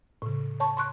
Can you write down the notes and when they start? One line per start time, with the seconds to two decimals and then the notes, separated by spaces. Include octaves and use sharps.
0.22 A2 C#3
0.60 C#5 A5 C#6
0.77 C6 C#6 F#6